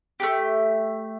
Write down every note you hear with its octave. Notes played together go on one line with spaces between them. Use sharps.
A3 D4 G4